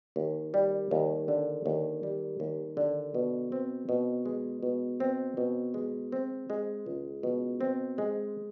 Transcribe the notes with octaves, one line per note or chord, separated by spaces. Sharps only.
D#2
G3
D#2
D3
D#2
G3
D#2
D3
B2
C4
B2
G#3
B2
C4
B2
G#3
C4
G#3
C#2
B2
C4
G#3